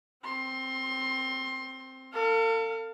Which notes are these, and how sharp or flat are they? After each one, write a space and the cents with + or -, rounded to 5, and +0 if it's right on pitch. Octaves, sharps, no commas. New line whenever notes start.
C4 +0 C6 +25
A4 +40 F5 +0